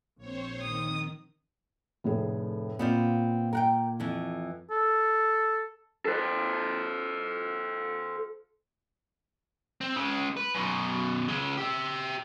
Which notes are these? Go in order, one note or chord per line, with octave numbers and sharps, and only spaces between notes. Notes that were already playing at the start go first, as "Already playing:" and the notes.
A#1 C4 C5 C#5
D#3 D#6
F1 A2 G#4
A#2 B3 C4 F4
A#4 F#5 G5
F2 E3
A4
A4 C5
C4
C#3 G#3
B4
F#2 B2
C#3 G#3
G4 E5